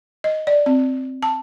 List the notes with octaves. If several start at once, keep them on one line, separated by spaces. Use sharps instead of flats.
D#5
D5
C4
A5